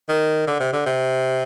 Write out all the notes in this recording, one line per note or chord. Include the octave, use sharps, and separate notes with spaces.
D#3
D3
C3
D3
C3